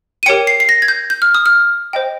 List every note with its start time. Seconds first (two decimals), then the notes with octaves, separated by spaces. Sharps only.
0.23 D#7
0.26 G4 A#4 C#5 G5 C#7
0.47 C7
0.60 C7
0.69 A#6
0.82 G#6
0.88 G6
1.10 G6
1.22 F6
1.35 D#6
1.46 F6
1.93 C5 D#5 G5